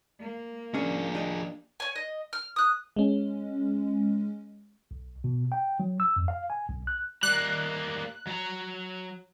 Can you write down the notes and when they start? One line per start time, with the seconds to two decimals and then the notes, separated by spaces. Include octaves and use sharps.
0.20 A#3
0.74 F3 C#4 D4 G#4
1.15 D4 G4 D#5
1.80 C#5 G#5
1.96 D#5
2.33 F6
2.56 D#6 F#6
2.96 G#3 C#4
4.91 B1
5.24 B2
5.52 G5
5.80 F#3
6.00 E6
6.16 F2
6.28 F5
6.50 G#5
6.69 B1
6.87 F#6
7.23 G3 A#3 F#6
8.27 F#3 A#5